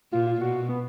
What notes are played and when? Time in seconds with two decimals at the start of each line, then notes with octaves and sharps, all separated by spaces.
0.12 A#2 F4
0.27 F4
0.41 B2 F#4
0.69 B3